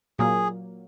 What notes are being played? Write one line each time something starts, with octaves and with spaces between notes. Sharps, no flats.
A#2 F#3 A#3 G#4